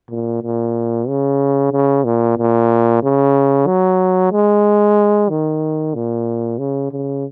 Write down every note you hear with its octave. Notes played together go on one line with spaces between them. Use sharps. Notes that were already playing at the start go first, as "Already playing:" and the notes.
A#2
A#2
C#3
C#3
A#2
A#2
C#3
F#3
G#3
D#3
A#2
C#3
C#3